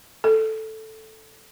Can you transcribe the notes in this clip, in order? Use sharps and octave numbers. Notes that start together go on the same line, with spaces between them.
A4